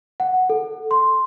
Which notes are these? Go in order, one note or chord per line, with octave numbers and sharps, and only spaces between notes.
F#5
A4
C6